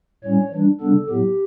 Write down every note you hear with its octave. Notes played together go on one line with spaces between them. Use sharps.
A2 G3 C#4 C#5
E3 G3 D4
C#3 G3 B3 D4 A4
A2 F#3 B3 G4